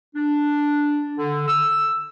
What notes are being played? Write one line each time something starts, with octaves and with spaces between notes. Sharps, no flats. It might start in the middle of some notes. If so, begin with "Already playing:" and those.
D4
D3
E6